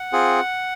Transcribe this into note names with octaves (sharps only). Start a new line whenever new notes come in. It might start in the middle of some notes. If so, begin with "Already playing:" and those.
Already playing: F#5
C4 F4 G#4